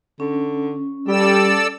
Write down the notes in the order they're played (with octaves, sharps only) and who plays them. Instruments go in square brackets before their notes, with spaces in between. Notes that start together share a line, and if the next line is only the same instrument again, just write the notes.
[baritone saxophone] D3 [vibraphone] C#4
[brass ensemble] G3 [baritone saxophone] G4 [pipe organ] A4 D5 E6